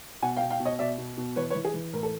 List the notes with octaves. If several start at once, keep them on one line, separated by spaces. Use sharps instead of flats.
B2 F#5 G#5
F5 G5
B2
F5 G5
B2
C#5 D#5
B2 D5 E5
B2
B2
E3 B4 C#5
B4 C#5
E3
G#4
E3
A2 A#4
A4